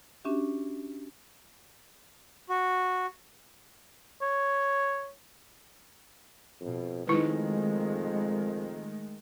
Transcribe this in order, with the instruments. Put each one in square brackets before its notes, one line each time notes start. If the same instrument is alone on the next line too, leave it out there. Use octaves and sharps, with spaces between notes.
[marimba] C#4 D4 F#4 G4 E5
[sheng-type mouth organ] F#4
[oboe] C#5
[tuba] F2 [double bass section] B2
[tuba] F2 [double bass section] D#3 G#3 A3 [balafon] D#4 E4 B4